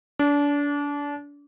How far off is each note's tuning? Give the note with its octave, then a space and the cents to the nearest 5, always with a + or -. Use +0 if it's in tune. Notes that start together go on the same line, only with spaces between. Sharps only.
D4 -30